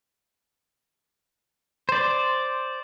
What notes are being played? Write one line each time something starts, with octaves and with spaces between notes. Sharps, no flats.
C5 D5